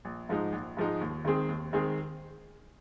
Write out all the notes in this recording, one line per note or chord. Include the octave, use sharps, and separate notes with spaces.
A#1
G#2 F3 G#3 D#4
A#1
G#2 F3 G#3 D#4
D#2
D#3 G#3 C4 G#4
D#2
D#3 G#3 C4 G#4